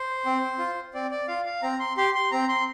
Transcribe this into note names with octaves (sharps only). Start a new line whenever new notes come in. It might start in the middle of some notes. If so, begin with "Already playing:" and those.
Already playing: C5
C4
F4
C4 D5
D5
F4 F5
F5
C4 A#5
C6
G4 C6
C6
C4 A#5
C6